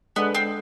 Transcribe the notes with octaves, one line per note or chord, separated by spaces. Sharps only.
G#3 B3 D4 A4
C4